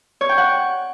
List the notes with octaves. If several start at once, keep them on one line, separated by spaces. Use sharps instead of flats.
C#5
G5
F#5